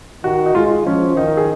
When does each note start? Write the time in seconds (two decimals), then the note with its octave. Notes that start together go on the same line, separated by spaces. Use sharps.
0.24 D#3 F#4
0.46 D#4
0.55 G#3 F4
0.65 F4
0.86 F3 C#4
1.17 D#3 D#4
1.28 A#4
1.37 G#4